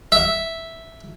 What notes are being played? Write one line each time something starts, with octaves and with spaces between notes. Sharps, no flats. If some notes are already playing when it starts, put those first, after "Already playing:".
E5